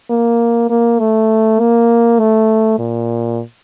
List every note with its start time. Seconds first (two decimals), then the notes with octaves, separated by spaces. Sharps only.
0.10 A#3
0.69 A#3
0.99 A3
1.59 A#3
2.19 A3
2.78 A#2